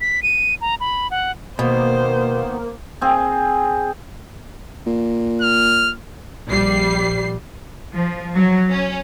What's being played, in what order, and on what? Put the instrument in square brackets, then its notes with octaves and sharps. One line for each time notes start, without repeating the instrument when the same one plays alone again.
[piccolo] B6
D#7
A#5
B5
F#5
[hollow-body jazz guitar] B2 [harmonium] D#3 B3 [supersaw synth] A#3 [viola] C5
[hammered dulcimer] C4 G#4
[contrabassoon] A#2
[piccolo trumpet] F6
[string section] A#1 G3 C7
F3
F#3
C#4